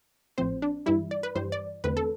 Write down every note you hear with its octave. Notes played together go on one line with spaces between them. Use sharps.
A1 A2 F3 C4 C5
D4
G2 E3 G3 E4
D5
B4
G2 E3 G3 C5
D5
E2 D3 A3 C4 B4
A4